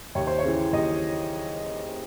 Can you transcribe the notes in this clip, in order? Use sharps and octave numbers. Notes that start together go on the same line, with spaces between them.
D#2 C#5
C5
C#5
C#3 E3
D#2 D#5